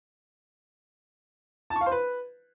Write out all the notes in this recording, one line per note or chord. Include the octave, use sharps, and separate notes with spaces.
A5
C#6
F5
C5
B4